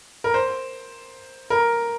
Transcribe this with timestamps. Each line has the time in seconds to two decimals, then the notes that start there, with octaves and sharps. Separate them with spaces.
0.24 A#4
0.34 C5
1.50 A#4